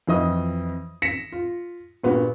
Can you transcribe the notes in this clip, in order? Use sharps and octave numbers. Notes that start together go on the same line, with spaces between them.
F2 E3 D#5 D#6
A#6 B6 C#7 E7
F4
G2 A#2 B3 F#4